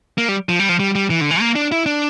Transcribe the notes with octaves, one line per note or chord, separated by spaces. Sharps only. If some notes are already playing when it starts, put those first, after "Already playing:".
A#3
G3
F3
G3
F3
G3
G3
E3
D3
E3
A#3
D4
E4
D4